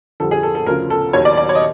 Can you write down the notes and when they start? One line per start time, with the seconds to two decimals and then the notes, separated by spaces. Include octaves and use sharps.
0.20 F2 D3 G3 A4
0.31 G#4
0.43 A4
0.55 A4
0.66 D2 C#3 F3 A#4
0.90 A4
1.13 D#2 D#3 F#3 C#5
1.25 D5
1.37 D5
1.49 C#5
1.55 D#5